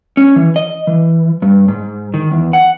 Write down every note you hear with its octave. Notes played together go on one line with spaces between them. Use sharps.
C#4
E3
D#5
E3
G2
G#2
D#3
E2
F#5